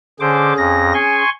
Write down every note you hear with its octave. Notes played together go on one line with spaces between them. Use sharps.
D3 C#4 G#4 C5 D6
F2 A#6
G#5 C6 C#6